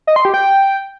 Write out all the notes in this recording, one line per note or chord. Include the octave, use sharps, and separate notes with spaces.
D#5
C6
G4
G5